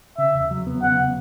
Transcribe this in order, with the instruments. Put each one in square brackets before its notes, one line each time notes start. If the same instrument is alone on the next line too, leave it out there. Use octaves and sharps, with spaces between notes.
[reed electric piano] C#3 [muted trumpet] E5
[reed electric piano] E2
F#3
B3
[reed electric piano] C#3 [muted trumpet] F#5